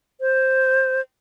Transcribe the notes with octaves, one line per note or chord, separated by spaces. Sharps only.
C5